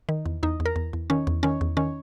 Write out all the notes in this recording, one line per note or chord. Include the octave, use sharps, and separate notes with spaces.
D#3
E2
E2 D#4
E2
A#4
E2
E2
D#3 C#4
E2
D#3 C#4
E2
D#3 C#4